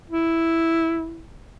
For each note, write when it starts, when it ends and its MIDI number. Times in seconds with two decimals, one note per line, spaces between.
0.10 1.24 64